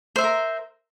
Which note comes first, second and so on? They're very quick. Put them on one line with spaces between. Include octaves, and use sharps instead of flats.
C5 E5 C6 A#4